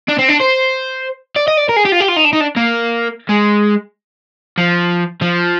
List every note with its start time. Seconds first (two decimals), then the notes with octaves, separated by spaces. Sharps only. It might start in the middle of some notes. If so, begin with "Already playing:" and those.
0.09 D4
0.19 C4
0.29 D4
0.41 C5
1.36 D5
1.48 D#5
1.57 D5
1.69 A#4
1.77 G#4
1.85 G4
1.92 F4
2.00 G4
2.08 F4
2.17 D#4
2.25 D4
2.33 D#4
2.41 D4
2.56 A#3
3.29 G#3
4.58 F3
5.22 F3